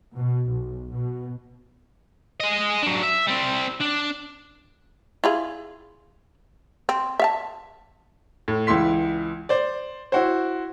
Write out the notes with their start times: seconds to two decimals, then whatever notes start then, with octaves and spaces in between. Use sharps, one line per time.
0.15 B2
0.50 B1
0.93 B2
2.40 G#4 D#5
2.83 F#3 D4
3.03 E5
3.27 G3 C4
3.80 D4
5.24 E4 F4 G#4
6.89 C4
7.19 E5 F5 A5
8.48 A2
8.67 C#2 E3 E4 C6 B6
9.49 C5 D5
10.12 E4 F#4 C5